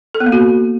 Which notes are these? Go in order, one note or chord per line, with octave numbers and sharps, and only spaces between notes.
A4
B3
A#3
F#4